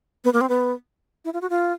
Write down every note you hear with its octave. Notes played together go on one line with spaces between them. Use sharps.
B3
A#3
C4
B3
E4
F4
F#4
F4